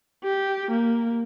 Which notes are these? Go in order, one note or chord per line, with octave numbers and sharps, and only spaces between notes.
G4
A#3